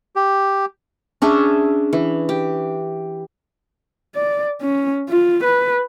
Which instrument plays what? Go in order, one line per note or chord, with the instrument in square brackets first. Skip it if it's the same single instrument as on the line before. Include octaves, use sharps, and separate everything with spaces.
[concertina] G4
[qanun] C#4 D4 G#4 E5
E3
G4
[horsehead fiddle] D5
C#4
F4
B4